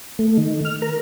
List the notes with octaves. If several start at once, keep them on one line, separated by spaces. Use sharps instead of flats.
A3
D#3
F6
A#4